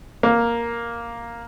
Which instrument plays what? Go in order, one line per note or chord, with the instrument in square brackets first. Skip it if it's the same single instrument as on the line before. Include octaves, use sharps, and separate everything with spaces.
[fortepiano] A#3